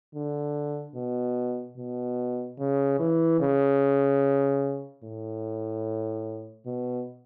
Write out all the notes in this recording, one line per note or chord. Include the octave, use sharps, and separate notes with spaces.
D3
B2
B2
C#3
E3
C#3
A2
B2